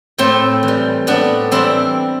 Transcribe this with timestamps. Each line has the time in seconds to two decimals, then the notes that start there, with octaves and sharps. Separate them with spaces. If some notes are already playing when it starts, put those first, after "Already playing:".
0.18 A2 A3 C4
0.63 E3
0.68 G3
1.07 A2 B3 D4
1.51 E3 G3 C4 E4